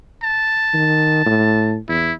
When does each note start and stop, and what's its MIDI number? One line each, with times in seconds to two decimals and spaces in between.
0.23 1.76 81
0.74 1.24 51
1.26 1.77 45
1.89 2.12 40
1.89 2.13 64